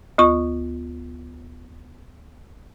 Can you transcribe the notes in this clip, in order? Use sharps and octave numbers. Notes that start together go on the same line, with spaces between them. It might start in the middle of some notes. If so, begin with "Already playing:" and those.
D2 F4 C#6